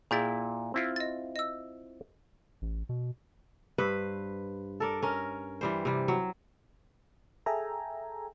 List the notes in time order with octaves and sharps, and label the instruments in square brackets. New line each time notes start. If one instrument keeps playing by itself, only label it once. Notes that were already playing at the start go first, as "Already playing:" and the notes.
[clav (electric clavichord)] A#2 E4 G5 [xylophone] G#4 G6 A6
[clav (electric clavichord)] C4 E4 F4
[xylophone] D#5 A6
D#5 E6
[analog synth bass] A1
B2
[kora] G2 B4 C5
A4 A#4 D5
C#4 A#4
E3 G3 C5
C3 G3
F#3
[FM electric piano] G#4 A4 E5 G5 G#5 A#5